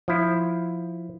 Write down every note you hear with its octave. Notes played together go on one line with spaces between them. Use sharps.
F3 E4